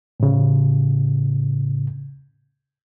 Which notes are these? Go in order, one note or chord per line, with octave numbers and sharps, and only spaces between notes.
A2 C#3